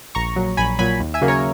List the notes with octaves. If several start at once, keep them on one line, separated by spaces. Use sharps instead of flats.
A#1 A#5 C#6
A#2 F#3
A#1 G#5 B5
A#2 F#3 G#5 B5
D#2
E5 G#5
C#3 F#3 A#3
A#4 C#5